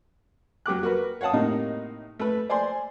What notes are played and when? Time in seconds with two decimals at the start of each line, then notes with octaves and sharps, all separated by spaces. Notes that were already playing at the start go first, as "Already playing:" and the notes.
0.66 F#3 G4 D6 F#6
0.83 F#4 A#4 B4
1.21 C#5 F5 F#5 A5 D#6
1.33 A2 C3 A#3 D#4
2.19 A3 B4
2.50 C5 D5 G#5 C6